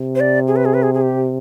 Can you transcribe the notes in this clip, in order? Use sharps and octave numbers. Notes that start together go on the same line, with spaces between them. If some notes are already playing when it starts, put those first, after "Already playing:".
Already playing: C3
C5
D5
G#4
B4
G#4
B4
G#4
G#4
G4